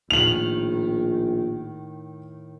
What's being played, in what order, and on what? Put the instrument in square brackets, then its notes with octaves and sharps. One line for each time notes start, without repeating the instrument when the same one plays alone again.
[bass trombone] A#1 [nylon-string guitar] A2 D#3 [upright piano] F7 F#7